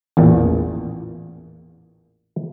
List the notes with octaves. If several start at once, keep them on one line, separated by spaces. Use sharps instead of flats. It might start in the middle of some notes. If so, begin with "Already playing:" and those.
A1 E2 A#2